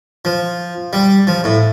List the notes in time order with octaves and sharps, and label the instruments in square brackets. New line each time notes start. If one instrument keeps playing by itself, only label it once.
[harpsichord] F3
G3
F3
A2